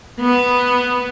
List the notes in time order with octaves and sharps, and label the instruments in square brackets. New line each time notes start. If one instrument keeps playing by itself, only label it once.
[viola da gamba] B3